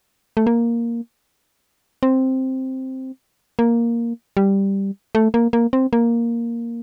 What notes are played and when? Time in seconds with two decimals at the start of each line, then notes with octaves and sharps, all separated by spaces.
0.37 A3
0.47 A#3
2.03 C4
3.59 A#3
4.37 G3
5.15 A3
5.34 A#3
5.53 A#3
5.73 C4
5.93 A#3